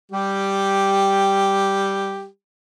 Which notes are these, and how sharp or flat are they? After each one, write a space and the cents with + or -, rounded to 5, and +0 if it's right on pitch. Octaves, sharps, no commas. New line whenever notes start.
G3 +0 G4 +0